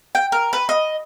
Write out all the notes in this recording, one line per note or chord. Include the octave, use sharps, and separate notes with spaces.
G5
A#4
B4
D#5